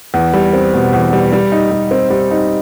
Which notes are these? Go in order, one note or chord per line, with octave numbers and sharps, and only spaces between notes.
E2
G3
C4
B2
E2
G3
G3
D#4
G3
C4
G3
D#4